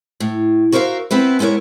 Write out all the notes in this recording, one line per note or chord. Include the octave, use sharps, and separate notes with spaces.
A2
F#4 A#4 C5 C#5 E5 F5
B3 C4 E4 B4
G#3 B3 E4 A#4 C#5